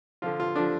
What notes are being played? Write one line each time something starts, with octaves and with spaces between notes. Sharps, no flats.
D3 F3 F4
F4
D3 F3 D4